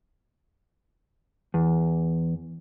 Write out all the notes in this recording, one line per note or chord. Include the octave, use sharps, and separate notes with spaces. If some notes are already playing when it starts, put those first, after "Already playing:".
E2